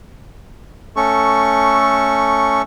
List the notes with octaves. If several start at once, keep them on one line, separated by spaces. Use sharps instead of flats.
A3 C#4 A4 C#6